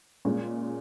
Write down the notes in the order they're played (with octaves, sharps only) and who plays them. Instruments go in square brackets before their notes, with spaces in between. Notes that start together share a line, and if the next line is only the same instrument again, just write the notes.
[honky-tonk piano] A#2 G#3 C#4